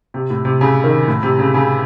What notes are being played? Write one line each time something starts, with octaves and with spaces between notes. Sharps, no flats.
C3
A2
C3
C#3
D#3
A2
C3
C#3
C#3